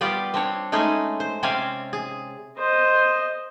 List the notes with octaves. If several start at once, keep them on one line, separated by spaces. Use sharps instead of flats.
G3 B3 F4 G4 D5
C4 D4 C#5
G#3 A3 C#4 D#4 G#4
C5
C3 C4 C#4 D5 F5 G#5
G#4
C5 D#5